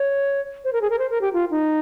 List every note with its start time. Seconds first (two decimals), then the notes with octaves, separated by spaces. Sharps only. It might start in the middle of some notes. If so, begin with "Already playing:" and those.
Already playing: C#5
0.64 C5
0.73 A#4
0.82 G#4
0.90 A#4
0.99 C5
1.10 A#4
1.21 G4
1.33 F4
1.51 D#4